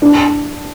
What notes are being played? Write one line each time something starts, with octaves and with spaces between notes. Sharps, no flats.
D4